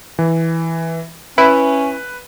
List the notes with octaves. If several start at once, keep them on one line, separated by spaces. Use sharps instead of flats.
E3
C#4 E4 B4